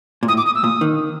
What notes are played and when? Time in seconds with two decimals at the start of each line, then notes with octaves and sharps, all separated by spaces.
0.23 A#2
0.28 A2 D#6
0.37 D6
0.46 D#6
0.55 E6
0.63 A#2 D#6
0.81 D#3